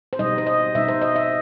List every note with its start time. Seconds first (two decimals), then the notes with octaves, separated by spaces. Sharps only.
0.13 C5
0.19 B2 G3 D#4 D#5
0.38 C5
0.47 D#5
0.75 B2 G3 D#4 E5
0.88 C5
1.02 D#5
1.16 E5